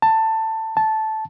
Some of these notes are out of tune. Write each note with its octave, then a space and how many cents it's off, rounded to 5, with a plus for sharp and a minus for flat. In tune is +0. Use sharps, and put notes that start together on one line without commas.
A5 +15
A5 -10